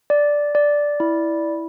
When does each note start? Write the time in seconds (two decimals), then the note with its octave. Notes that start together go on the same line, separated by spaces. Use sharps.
0.10 D5
0.55 D5
1.00 E4